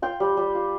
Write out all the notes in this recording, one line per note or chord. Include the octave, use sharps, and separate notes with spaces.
F4 G5
G3
G3
F4